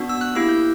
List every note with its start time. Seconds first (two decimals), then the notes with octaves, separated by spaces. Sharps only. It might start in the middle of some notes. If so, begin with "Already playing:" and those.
Already playing: B3 D4 F#4
0.09 E6
0.21 F#6
0.35 A#3 E4 G4 E6
0.49 G6